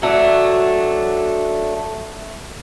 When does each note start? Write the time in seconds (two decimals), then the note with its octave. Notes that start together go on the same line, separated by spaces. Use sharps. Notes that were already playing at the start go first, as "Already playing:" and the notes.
0.02 F#3 A3 D4